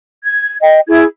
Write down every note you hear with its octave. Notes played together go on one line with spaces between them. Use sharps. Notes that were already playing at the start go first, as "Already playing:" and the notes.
G#6
D#5 G5
E4 G#4 G#6